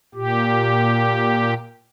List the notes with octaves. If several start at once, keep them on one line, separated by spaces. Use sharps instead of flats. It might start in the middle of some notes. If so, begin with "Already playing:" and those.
A#2 G4